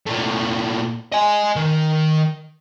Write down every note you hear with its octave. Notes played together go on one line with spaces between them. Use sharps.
A#2 A3
D#5 G#5
D#3